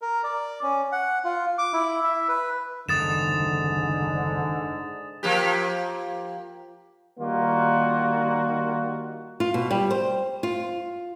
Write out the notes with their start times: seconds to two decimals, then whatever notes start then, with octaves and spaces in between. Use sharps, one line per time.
0.02 A#4
0.23 D5
0.63 C#4
0.92 F#5
1.24 F4
1.58 D6
1.73 E4
2.04 E5
2.28 B4
2.89 F#1 G#2 D3 D#3 D#6 A6 E7
5.23 F3 A#3 G4
7.20 D#3 G3 A#3 D#4 F4 F#4
9.40 F4
9.54 B2
9.71 G3
9.91 C5
10.43 F4